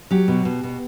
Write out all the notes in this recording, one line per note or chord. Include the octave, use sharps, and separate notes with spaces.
F#3 G4
B2
B2
B2